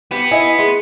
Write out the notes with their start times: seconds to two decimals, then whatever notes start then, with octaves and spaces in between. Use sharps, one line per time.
0.11 B3 G4
0.31 E4 D#5 G#5
0.58 G#3